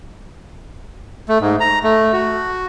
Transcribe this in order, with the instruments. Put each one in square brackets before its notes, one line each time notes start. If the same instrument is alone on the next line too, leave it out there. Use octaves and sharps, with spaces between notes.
[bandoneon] A3
G#2
A#5
A3
F#4